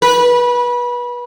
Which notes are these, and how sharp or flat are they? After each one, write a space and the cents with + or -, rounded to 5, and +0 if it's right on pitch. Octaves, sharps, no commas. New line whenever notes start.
B4 -25